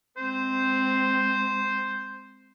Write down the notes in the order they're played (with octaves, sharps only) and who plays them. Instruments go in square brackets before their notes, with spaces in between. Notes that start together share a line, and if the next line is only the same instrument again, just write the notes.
[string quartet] G#3 C4 [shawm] C5